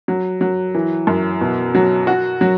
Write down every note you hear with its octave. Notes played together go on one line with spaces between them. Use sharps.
F#3
F#3
E3
F#2
B2
F#3
F#4
F#3